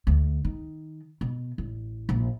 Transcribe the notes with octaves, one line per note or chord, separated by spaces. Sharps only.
D2
D#3
B2
A1
A#1